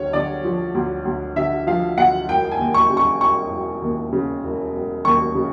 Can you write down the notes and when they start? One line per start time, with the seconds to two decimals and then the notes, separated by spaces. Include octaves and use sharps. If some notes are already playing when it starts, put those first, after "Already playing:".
Already playing: D2 D3 C#5
0.13 D3 D5
0.44 F3
0.75 D2
1.05 D2
1.36 D3 E5
1.67 F3 F5
1.98 D2 F#5
2.28 E1 G5
2.51 G#5
2.59 D#2
2.74 C#6
2.90 C#3
2.97 C#6
3.20 E1 C#6
3.51 E1
3.82 D#2
4.12 C#3
4.44 E1
4.73 E1
5.05 D#2 C#6
5.35 C#3